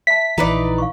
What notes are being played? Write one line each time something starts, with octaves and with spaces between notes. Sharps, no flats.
E5 A5 B6
A#1 E3 D#4 B4 D5
F5 C#6